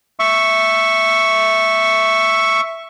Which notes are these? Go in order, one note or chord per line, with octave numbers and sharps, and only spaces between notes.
E5 C#6